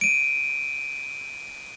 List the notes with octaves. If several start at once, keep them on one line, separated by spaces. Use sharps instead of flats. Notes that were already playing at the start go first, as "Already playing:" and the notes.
D7 D#7